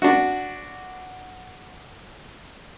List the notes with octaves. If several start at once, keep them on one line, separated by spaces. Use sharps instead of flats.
D4 F#4